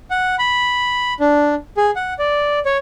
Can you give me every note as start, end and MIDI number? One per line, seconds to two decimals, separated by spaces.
0.10 0.36 78
0.39 1.13 83
1.20 1.55 62
1.77 1.91 68
1.96 2.14 78
2.19 2.59 74
2.65 2.77 73